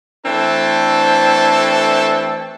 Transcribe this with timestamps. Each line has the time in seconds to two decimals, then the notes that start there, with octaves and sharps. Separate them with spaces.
0.25 E3 A3 C4 D4 A4